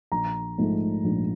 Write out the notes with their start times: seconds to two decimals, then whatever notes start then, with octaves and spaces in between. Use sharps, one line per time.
0.12 A#1 A#5
0.58 G#2 F3 A3
1.04 A#1